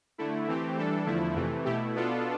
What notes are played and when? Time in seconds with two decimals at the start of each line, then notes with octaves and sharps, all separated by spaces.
0.18 D3 A3 E4
0.48 E3 A3 C4 G4
0.77 E3 G3 D4 A4
1.07 E2 D3 F3 A3 E4
1.36 F2 C3 E3 A3
1.65 B2 A3 E4 G4
1.95 B2 B3 D4 F4 A4